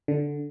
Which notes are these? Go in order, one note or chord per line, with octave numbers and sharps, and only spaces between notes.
D3